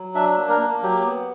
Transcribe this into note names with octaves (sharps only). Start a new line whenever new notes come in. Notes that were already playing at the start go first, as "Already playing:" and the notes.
Already playing: F#3
D4 E5
A#3
A#4
A#3
F#3 G4
B3